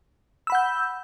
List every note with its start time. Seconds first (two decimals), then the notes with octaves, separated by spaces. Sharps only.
0.47 E6
0.50 B5
0.52 F#5
0.55 G6